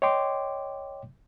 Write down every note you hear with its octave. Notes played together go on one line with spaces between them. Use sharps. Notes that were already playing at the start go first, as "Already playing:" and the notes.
C#5 D#5 G5 C6 D6